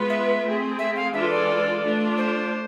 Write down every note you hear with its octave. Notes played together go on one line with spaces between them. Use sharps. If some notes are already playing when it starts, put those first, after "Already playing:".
Already playing: G#3 B3 F4 B4
E5
A3 C4 G#4
E5
F5
E3 G#3 D4 F4 A4 E5
D5
A3 D4 F4
C5